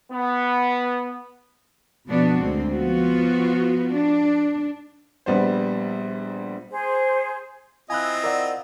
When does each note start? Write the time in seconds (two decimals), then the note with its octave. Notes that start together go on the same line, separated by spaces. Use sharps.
0.12 B3
2.07 B2 F3 B3 D4 F#4
2.40 D2 G#3 C4
2.74 F3 B3 F4 F#4
3.95 D4
5.26 A#1 G3 B3 C5
6.71 G#4 C5
7.90 C4 E4 F4 D#5 G#5 B5 F#6
8.24 A#4 D5 F#5